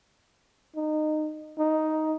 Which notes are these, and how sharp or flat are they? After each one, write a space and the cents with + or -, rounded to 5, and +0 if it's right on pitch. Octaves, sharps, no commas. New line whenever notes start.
D#4 -20
D#4 +5